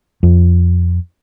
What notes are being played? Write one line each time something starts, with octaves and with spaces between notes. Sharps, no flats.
F2